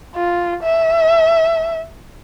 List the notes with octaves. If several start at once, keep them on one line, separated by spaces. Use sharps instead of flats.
F4
E5